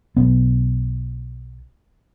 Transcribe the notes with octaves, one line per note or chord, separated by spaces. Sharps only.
B1 B3